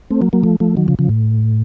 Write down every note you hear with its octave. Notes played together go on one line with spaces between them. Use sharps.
A3 C4
F#3 A#3
F#3 A#3
F3 A3
F3 A3
D#3 F#3
C#3 F3
C#3 F3
A2